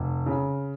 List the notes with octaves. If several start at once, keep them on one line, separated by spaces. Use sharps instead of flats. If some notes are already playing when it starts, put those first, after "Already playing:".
Already playing: F1
C#3